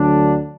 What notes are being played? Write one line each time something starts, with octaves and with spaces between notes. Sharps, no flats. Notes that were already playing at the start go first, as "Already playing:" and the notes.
Already playing: D2 D3 F#3 D4